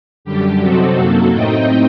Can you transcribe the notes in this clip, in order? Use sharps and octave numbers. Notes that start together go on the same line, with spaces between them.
F#2 D3 G3 G4
C3 F#3 C4 D#4 F#4 A4
F#2 F#3 A#3
A2 A3 C4 D#4 D#5 G5